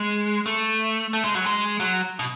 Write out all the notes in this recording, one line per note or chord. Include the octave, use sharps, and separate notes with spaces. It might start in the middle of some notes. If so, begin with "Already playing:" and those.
Already playing: G#3
A3
A3
G#3
F#3
G#3
F#3
B2